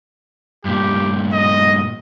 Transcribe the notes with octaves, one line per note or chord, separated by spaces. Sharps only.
G2 A#2 G4
D#5